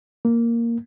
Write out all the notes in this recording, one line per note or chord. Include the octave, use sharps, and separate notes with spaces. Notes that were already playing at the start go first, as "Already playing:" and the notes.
A#3